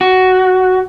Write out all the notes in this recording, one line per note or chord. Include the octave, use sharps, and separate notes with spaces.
F#4